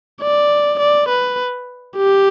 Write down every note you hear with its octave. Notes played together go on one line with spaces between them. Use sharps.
D5
D5
B4
G4